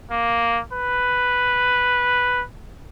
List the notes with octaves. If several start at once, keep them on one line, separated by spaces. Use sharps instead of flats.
A#3
B4